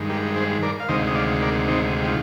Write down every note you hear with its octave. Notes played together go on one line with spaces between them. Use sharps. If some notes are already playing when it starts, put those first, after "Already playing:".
Already playing: G2 D#3 G#3
G4 A#4
G#4 C5
A#4 D5
F5
D2 C3 D#3 G#3 C5 D#5
D#5
D5 F5
A#4 D5
C4 D#4
G4
F4